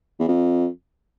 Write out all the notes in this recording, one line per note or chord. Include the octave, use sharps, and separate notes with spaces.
E2
F2